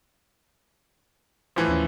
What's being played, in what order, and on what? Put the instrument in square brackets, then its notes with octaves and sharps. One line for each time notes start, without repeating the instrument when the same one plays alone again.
[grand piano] A2 E3 F3 [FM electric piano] C6 D6 G#6
[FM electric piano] D#2 C#4